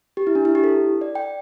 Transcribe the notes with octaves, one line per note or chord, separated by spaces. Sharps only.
G4
E4
D4
E4
G4
A4
D5
G5